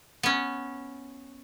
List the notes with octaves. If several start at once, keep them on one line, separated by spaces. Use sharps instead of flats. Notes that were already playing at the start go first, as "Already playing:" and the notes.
B3 C#4